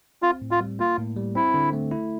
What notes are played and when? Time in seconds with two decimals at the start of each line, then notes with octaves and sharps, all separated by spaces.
0.22 C4 F4
0.42 A2
0.51 F4
0.60 G3
0.79 A#3 F4
0.98 A2
1.17 G3
1.35 C4 E4
1.54 D3
1.73 A3
1.91 E4